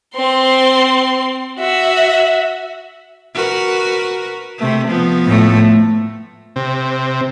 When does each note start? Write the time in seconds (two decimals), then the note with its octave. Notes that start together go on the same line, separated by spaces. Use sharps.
0.16 C4 C6
1.59 F#4 E5
3.35 F#4 A#4 B4
4.58 C3 A3
4.88 F3 B3
5.26 A2 A3
6.56 C3